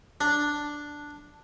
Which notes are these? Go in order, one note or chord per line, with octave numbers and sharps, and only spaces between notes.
D4